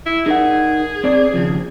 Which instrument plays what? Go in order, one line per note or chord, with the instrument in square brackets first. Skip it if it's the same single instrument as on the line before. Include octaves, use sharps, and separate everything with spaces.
[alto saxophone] E4
[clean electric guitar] D#4 A#4 F#5 [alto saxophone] G#4
[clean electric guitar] C4 D5
D#2 C#3 F3